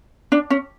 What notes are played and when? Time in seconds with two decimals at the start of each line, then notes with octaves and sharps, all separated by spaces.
0.32 D4
0.50 C#4